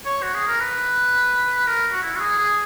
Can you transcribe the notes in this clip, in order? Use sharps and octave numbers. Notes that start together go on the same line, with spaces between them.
C#5
F#4
G#4
A#4
B4
A#4
F#4
E4
F#4
G#4
G#4